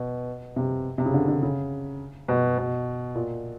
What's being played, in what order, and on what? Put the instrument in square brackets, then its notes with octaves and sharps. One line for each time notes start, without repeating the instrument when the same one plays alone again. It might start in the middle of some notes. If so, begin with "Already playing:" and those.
Already playing: [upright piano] B2
C3
C3
C#3
D3
D3
C#3
B2
B2
A#2